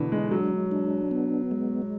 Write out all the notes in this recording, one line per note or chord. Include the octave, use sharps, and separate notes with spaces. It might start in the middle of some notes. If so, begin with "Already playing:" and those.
Already playing: B2 D3 E3 D4
G#3
F#3 G#3
D4
B3
G#3